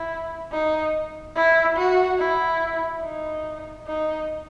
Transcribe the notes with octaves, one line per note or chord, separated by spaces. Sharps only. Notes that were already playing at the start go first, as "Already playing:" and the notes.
Already playing: E4
D#4
E4
F#4
E4
D#4
D#4